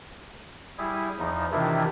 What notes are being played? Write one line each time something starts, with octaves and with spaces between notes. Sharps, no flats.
G3 E4 G#4
E2 F3 D#4
C3 D#3 E3 D4 E4 F4